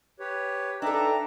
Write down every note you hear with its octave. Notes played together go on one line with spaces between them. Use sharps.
G4 B4 C#5
D4 D#4 A4 B4 E5 G5 A#5